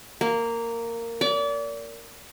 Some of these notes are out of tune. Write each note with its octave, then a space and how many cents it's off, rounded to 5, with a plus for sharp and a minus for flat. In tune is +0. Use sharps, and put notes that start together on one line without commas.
A#3 -10
D5 -35